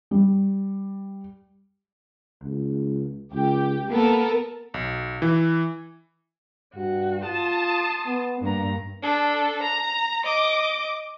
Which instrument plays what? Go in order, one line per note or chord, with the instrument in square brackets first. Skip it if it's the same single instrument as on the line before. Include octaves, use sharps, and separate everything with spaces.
[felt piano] G3
[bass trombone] C#2
[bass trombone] C#2 [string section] G4
[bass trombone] A#3 [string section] B3 A4 A#4
[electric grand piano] B1
E3
[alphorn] G2 [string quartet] F#4
[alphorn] F4 [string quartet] A5 C6 D#6
[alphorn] B3
[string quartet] G2 A#5 [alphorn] A#3
[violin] D4 A4
A#5
D#5 D6